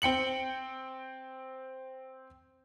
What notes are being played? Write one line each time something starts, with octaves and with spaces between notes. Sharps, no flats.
C4 G5 C#7 F#7